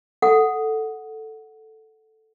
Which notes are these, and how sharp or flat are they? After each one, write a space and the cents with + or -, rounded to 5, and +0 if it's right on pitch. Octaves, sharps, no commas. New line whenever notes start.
A4 +0 F#5 +0